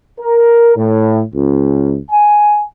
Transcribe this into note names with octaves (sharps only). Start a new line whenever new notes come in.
A#4
A2
C#2
G#5